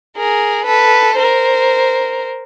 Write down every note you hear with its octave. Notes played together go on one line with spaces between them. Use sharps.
G#4 A#4
A4 B4
A#4 C5